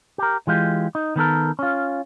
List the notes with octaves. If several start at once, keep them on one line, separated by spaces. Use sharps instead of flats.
G4 A#4
E3 G#3 F4 G4
D#4
D#3 B3 A4 A#4
C#4 F4